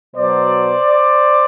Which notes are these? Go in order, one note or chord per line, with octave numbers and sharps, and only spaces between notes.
B2 F#3 C5 D5